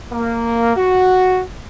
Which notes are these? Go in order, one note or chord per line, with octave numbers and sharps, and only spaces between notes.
A#3
F#4